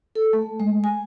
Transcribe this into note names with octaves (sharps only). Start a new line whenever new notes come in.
A4
A3
G#3
G#5